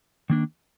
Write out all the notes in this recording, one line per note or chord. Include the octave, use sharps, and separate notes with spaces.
D#3 A#3 D4